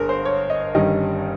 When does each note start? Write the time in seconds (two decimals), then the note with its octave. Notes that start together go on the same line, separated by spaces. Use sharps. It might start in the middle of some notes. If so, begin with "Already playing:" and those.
Already playing: G1 G#4 A#4
0.09 C5
0.25 C#5
0.50 D#5
0.75 G1 G2 D#3 G3 C#4 D#5